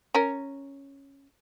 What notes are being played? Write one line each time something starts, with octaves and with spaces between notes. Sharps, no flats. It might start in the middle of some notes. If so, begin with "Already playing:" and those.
C#4 A#4